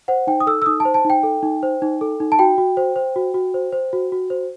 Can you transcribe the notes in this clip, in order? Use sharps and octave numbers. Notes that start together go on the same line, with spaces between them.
C5 F#5
D#4 G5
D#6
A4 E6
E6
D#4 D#6
A5
C5
A5
D#4
G5
A4
D#4
C5
D#4
A4
D#4
A5
F#4 G5
F#4
C5
C5
F#4
F#4
C5
C5
F#4
F#4
C5